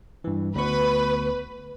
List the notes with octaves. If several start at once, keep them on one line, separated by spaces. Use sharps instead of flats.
G2 E3
D2 B3 B4 C#6